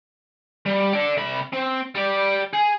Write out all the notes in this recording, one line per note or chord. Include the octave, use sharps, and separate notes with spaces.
G3
A4 D5
C3 B5
C4
G3 D5
G#4